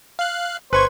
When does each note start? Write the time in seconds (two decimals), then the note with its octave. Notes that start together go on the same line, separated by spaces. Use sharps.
0.19 F5 F#6
0.73 G1 B4 C5 C#6 G#6